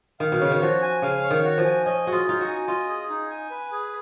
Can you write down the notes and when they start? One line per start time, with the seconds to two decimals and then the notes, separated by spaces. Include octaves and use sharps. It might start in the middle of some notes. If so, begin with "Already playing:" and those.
0.20 D#3 F5
0.32 B2
0.41 C#3 C#5
0.51 D#3
0.62 F3 F#4
0.82 G#5
1.02 C#3 F5
1.24 C#5
1.31 D#3
1.44 F#4
1.58 F3
1.64 G#5
1.85 C#4 D#5
2.06 F#4 G#4
2.12 F4
2.27 D#4 F4
2.41 F#4
2.47 G#5
2.68 F4 D#5
2.89 G#4
3.10 D#4
3.30 G#5
3.50 B4
3.71 G#4